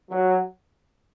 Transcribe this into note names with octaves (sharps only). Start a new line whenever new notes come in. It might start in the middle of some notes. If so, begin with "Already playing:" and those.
F#3